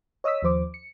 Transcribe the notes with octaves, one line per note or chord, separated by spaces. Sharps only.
C#5 D#5 D#6 E6 B6
D#2 F3 C5 D6
C#7